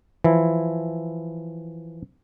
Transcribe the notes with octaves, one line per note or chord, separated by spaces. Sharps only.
E3 F3 E4